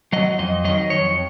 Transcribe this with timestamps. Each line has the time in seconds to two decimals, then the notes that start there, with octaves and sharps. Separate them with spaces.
0.13 F#3 D#5
0.39 F2 D#5
0.65 D#3 F#3 D#5
0.90 F2 C#5